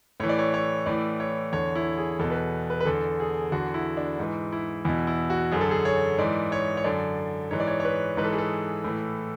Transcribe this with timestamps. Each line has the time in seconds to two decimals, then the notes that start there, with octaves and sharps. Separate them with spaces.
0.20 A2 E3 C#5
0.29 D5
0.39 C#5
0.54 C#5
0.86 A2 E3 D5
1.20 C#5
1.53 E2 D3 C#5
1.75 E4
1.98 G#4
2.19 E2 B2 A4
2.30 B4
2.36 A4
2.70 B4
2.80 B4
2.85 E2 D3 A4
3.20 G#4
3.52 E2 D3 F#4
3.74 E4
3.97 D4
4.19 G#2 E3
4.52 E4
4.85 E2 B2 E4
5.07 E4
5.30 F#4
5.52 F#2 D3 G#4
5.61 A4
5.71 G#4
5.85 C#5
6.18 G#2 E3 D5
6.52 C#5
6.77 C#5
6.84 F#2 D3 D5
7.51 G#2 E3 C#5
7.60 D5
7.67 C#5
7.80 C#5
7.85 B4
8.17 G#2 E3 B4
8.24 A4
8.32 G#4
8.38 A4
8.84 A2 E3